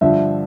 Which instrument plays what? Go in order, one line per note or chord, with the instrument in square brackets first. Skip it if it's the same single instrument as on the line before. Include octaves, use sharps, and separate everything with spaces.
[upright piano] G2 D3 F3 [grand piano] E5